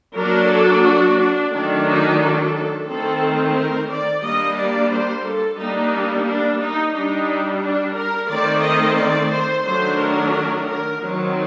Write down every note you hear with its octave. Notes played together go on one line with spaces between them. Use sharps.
F#3 A#3 D4 A#4
A4
F#4
D4
D#3 F#3 A3 D4
D#4
A4
D#3 A3 C4 A4
A#4
D5
G3 A#3 D4 D#5
D5
C5
A4
G3 A#3 D4 D#4
D4
D#4
G3 D4 D#4
D4
A#4
D#3 A3 C4 D5
D#5
D5
C5
D#3 F#3 A3 D4 C5
A#4
A#4
D#3 F#3 C4